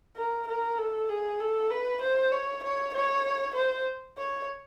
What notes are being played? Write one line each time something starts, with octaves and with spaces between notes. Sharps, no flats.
A#4
A#4
A4
G#4
A4
B4
C5
C#5
C#5
C#5
C5
C#5